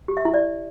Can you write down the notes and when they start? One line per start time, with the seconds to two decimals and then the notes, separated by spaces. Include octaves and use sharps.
0.08 G4
0.17 E5
0.25 E4
0.34 D5